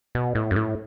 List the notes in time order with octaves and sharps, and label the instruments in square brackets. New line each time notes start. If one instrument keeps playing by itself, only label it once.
[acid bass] B2
A2
F#2
A2